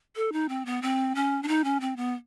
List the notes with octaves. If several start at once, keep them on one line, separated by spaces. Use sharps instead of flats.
A4
D#4
C4
B3
C4
C#4
D4
D#4
C#4
C4
B3